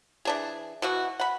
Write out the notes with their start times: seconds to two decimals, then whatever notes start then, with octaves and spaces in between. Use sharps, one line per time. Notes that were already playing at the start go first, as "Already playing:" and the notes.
0.25 E3 D4 G#4
0.82 B2 E3 F#4
1.20 F#5 B5